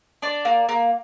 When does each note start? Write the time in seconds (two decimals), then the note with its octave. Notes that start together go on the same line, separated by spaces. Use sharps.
0.22 D4 D5
0.45 A#3
0.69 A#3